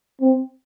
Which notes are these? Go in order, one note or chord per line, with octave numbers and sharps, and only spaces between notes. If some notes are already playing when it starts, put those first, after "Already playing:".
C4